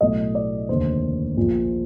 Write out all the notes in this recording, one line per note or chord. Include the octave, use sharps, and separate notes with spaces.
B1 A2 F#3 A3 D#5
D5
F1 D#2 D3 C5
A#1 A#2 F3